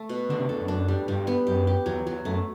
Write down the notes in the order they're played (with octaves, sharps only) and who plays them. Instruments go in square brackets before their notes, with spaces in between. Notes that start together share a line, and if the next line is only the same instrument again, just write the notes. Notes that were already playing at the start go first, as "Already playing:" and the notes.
Already playing: [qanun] A3 A4
B2
[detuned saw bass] D3 [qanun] D4
[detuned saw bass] C3
[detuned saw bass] E2 [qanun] A4
[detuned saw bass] F#2
[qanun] D4
G3
[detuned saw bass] G2 [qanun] G3
[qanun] B3
[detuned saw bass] F#2 [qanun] G4
[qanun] G4
[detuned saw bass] E2 [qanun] F#3
[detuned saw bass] E2 [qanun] F#3
[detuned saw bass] F#2 [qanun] A3